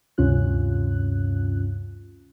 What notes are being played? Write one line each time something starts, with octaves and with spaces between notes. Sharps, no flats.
D2 G2 C3 C#4 F4 F#6